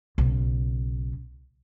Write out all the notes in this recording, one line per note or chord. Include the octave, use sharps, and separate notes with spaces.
B1 C#3